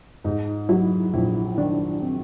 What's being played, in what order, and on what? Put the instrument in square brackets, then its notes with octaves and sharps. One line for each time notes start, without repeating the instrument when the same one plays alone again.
[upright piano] G#2 [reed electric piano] D#4
[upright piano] F#3 [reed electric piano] E4
[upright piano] A#1 [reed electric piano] E4
[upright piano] D#3 [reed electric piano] D4
[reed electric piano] C4